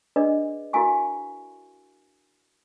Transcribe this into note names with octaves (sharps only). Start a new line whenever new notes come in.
D4 G#4 B4 D5 D#5
E4 F#4 A#4 F5 G#5 C#6